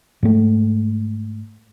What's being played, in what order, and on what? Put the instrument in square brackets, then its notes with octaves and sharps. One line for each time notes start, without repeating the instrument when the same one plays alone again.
[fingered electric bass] G#2 G#3 A3